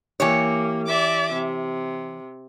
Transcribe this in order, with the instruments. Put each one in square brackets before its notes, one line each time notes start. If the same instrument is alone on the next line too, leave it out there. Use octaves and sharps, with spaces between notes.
[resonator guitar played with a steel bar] E3 G4 C#5 [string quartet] A#3
[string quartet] D5 E5 D6
C3